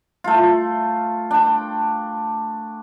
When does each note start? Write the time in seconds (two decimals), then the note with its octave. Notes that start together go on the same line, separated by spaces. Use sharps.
0.24 A3 F4
1.31 D4 G5